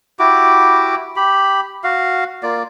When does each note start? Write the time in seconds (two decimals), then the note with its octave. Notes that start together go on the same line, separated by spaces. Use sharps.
0.19 E4 F#4 G4 D6
1.16 G4 B5
1.84 F#4 F5
2.43 A#3 F4 D5